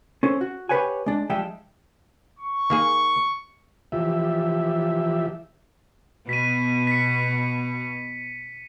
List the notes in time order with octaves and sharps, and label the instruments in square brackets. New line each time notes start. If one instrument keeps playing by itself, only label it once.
[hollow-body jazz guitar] C#4 A4 C5
F#4
G4 G#4 B4 C#5 F#5 G#5
G#3 D4
F3 G3 G#3 E5 G5
[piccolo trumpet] C#6
[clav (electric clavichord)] D#3 A#3 G#4
[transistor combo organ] E3 F3 G4 E5
[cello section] B2 [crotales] B6 D#7
[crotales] B6 C#7